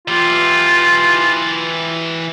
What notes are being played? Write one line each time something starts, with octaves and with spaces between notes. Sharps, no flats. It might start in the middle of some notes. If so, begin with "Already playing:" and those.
E3 F4 G4